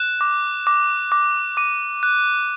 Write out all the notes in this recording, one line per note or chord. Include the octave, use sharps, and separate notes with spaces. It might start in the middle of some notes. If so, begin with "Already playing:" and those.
Already playing: F#6 E7
D6
D6
D6
D6 D#7
F#6